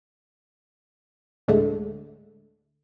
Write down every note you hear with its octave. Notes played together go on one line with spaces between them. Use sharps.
D2 A2 D3 G#3 A3